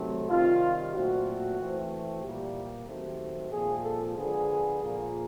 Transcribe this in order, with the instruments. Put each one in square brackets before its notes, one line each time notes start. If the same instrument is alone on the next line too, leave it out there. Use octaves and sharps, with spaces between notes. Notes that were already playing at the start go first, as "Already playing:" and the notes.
Already playing: [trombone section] C3 D#3 F#3 A3 C4
C3 D#3 G3 C4 F4
A#2 F#3 A3 C4 F#4
E3 A3 C4
A#2 G3 A#3 G4
D#3 F#3 A3 C4
A#2 F3 G#3 C4 G#4
A4
D3 F3 G#3 B3 G#4
A#2 F3 A#3